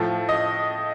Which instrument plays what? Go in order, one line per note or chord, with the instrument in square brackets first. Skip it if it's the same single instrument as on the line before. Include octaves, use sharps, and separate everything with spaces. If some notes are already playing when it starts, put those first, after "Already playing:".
Already playing: [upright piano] A2 F3
D#5